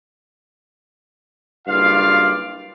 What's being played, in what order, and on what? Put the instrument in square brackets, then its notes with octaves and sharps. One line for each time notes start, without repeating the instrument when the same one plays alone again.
[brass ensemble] F#1 G2 F4 D5 F5